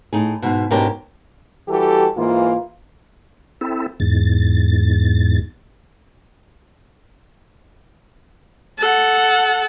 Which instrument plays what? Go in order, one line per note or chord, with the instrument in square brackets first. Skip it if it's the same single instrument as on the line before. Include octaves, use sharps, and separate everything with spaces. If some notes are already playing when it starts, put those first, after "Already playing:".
[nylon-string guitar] A2 D#4 G#4
G#2 B2
G#2 B2 C#4 D4 G4 A#4
[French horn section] E3 G3 F#4 G4 A4
G#2 E3 A#3 F4
[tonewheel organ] C4 E4 A4
E2 G#2 A6
[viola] A4 F#5